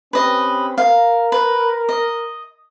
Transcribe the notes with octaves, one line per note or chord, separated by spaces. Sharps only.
C4 C#4 G4 B4 D#5
A#4 F5
B4
D#5